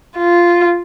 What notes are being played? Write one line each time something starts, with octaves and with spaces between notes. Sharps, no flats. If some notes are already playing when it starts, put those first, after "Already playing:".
F4